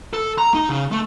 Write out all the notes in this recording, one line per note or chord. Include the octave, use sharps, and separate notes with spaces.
A4
A#5
D#4
C#3
A3